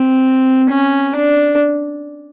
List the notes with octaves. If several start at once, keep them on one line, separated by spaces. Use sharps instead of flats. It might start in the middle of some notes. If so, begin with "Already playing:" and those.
Already playing: C4
C#4
D4